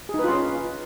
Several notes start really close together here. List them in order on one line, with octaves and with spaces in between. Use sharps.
G#4 D#4 B4 F4 C#4